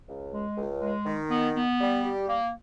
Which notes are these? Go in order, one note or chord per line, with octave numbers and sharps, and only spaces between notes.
C#2
G#3
C#2
G#3
D#3
B3
B3
G3
G4
A#3